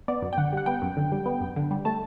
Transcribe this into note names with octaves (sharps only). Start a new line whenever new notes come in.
B3 D5
F#2
G5
D3 F#5
G3 F#5
B3 G5
F#2
D3
G3
B3
F#2
D3
G3
A3 A5